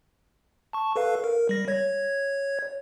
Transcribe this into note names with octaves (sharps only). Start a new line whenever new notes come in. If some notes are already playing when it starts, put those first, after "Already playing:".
A5 C#6
A4 B4 F5
A#4
G3 A#6
C#5 G#6